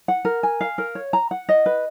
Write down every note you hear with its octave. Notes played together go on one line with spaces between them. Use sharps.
F#5
A#4
G#5
F5
A#4
C#5
A#5
F#5
D#5
B4